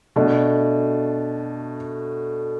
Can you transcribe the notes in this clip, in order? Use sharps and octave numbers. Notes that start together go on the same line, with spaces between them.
B2 A3 D4